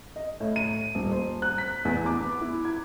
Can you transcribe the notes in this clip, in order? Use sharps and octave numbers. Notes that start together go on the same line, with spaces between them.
D#5
A2
D#7
D#1
C5
F#6
B6
E2
D6
B3
E4
G#6